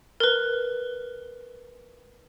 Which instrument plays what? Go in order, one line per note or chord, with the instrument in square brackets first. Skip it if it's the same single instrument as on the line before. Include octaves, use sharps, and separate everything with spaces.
[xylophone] A#4 B4